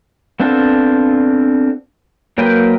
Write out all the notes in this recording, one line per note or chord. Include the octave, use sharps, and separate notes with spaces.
B3 C4 D4 F4 A4
F#3 A#3 A#4 B4 G5